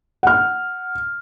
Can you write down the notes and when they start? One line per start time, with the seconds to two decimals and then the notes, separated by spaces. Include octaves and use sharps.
0.23 F#5 F6